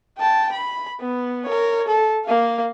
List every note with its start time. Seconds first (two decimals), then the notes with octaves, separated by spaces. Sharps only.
0.18 G5 A5
0.52 B5
1.00 B3
1.45 A#4 C#5
1.88 A4
2.26 A#3 F5